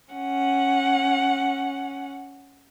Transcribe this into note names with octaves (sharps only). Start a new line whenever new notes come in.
C#4 F#5